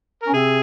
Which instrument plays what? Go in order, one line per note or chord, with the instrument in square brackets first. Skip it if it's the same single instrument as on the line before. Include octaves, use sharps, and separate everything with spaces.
[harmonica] A#4
[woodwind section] C#4
[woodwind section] C3 C4 [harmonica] G#4